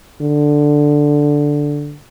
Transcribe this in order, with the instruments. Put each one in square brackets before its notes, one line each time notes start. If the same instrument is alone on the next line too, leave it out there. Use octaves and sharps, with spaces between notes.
[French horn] D3